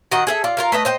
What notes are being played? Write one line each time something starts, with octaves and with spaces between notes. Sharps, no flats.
D#3 F#4 D#5 F#5
G#4 A4 E5
F4 D5
F4 A#4 F5
A3 B4 D#5
C5 D#5 G5